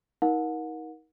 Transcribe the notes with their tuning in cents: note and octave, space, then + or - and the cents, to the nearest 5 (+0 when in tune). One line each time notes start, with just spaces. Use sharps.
D#4 +30 A#4 +25 F#5 -35